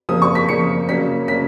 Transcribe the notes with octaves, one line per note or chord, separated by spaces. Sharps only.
C#3 F3 A#3 D#6
C#6
B6
C#3 F3 A#3 C#7
C#3 F#3 A#3 C#4 B6
C#3 F#3 A#3 C#4 B6